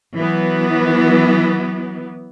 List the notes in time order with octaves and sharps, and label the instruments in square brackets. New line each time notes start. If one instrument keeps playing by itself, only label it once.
[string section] E3 F#3 B3